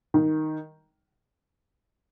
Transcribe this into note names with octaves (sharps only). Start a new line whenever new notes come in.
D#3